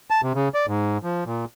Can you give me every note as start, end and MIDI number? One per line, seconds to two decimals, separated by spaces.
0.11 0.21 81
0.23 0.33 48
0.35 0.48 49
0.54 0.66 74
0.67 0.98 44
1.03 1.24 53
1.26 1.45 46